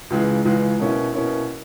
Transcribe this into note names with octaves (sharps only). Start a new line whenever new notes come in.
C#2 C#3 E3 G#3
C#2 C#3 E3 G#3
B2 A#3 C#4 E4
B2 A#3 C#4 E4